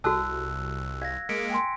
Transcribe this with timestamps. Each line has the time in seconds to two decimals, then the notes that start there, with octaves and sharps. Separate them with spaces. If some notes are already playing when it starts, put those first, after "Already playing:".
0.04 C2 F#4 A4 A5 D#6 E6 F#6
1.02 F5 G#6 A#6
1.29 G#3 A#3 B6 C#7 D7
1.50 G5 G#5 C6